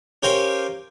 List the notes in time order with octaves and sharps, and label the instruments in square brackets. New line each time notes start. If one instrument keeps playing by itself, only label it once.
[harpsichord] C#4 G4 A#4 C5 F5 G#5